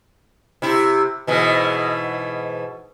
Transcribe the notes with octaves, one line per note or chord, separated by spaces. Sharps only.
C3 E4
G#2 B2 E3